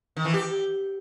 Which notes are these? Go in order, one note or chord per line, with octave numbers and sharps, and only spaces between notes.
D#3
E3
G4